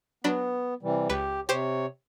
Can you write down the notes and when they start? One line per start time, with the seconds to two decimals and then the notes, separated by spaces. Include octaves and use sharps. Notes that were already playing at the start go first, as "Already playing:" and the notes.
0.24 F#3 B3 D4 B5
0.83 C3 E3 G3
1.09 C#2 G4 B4
1.49 C3 G4 C5 C#5